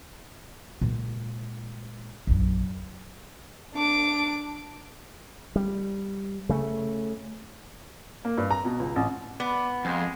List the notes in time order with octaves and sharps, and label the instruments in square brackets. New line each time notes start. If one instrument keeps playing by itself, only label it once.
[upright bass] A#2 G#3
A#1 F#2
[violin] D4 D6
[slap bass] G3
C#3 A3
[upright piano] A#3
G2
A#5
B2
C#2
A1
[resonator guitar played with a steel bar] B3 [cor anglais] D5
[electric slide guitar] F2 [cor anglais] G#3